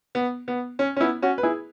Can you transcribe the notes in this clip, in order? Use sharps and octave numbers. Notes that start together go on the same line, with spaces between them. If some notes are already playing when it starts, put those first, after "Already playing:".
B3
B3
C#4
C#4
B3 E4
C#4 F#4
B4
E4 G#4